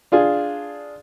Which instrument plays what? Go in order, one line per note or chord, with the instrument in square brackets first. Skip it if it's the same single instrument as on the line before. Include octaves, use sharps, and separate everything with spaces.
[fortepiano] D4 F4 G#4